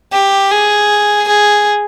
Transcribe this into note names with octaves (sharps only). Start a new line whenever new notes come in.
G4
G#4
G#4